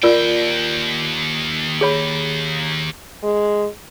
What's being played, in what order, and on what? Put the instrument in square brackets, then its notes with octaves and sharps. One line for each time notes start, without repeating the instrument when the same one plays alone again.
[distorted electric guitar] D#2 G5 [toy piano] F4 A#4 D5
[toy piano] G#4 C#5 B5
[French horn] G#3